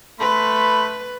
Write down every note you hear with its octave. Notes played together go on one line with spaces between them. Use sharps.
A3 B4 B5 C6